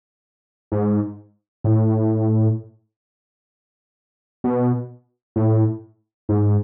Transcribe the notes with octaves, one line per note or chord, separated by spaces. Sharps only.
G#2
A2
B2
A2
G#2